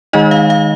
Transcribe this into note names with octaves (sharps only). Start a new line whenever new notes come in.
D#3 G#3 D#4 D#5
F5
F5